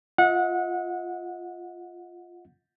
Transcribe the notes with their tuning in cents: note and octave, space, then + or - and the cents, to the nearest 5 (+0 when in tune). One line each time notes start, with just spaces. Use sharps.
F4 +0 D#5 +40 F#5 -25